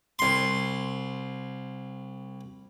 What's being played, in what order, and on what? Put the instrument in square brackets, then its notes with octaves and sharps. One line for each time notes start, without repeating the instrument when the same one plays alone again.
[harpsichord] C2 C6